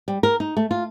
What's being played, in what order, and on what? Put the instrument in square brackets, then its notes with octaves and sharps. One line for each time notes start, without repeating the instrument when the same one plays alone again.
[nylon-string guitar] G3
A#4
D#4
A3
F4